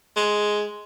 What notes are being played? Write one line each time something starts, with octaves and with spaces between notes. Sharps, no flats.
G#3